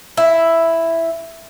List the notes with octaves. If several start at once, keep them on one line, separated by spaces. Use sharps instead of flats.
E4